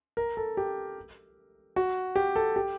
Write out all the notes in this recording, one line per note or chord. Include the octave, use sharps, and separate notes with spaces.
A#4
A4
G4
F#4
G4
A4
G4